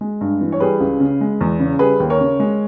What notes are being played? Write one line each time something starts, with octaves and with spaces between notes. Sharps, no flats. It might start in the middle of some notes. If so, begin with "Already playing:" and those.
G#3
G2
E3
C#5
G3 G#4 B4
C#2
C#3
G#3
E2
C#3
G3 G#4 B4
D#2
A#4 C#5
C#3
G#3